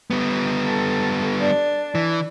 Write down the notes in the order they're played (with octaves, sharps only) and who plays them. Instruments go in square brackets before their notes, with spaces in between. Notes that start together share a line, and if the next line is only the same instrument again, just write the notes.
[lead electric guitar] G3 B3
[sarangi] A4
D4
[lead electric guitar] E3